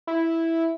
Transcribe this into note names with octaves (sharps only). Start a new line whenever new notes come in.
E4